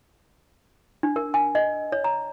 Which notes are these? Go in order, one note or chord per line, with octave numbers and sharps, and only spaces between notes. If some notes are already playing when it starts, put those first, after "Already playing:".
D4
A#4
G#5
D#5
C#5
A#5